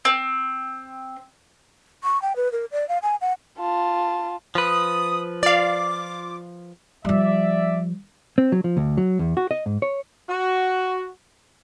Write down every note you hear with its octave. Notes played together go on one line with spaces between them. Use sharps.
C4
C#6
G5
B4
A#4
D5
F5
G#5
F#5
F4 A5
F3 B4 D#6
F4 D5 F5 D6
F3 G3 D5 E5
C4
F#3
F3
D2
F#3
E2
F#4
D#5
G#2
C#5
F#4